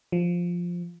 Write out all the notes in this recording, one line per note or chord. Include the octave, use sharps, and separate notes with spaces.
F3